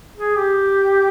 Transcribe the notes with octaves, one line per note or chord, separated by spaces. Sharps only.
G#4
G4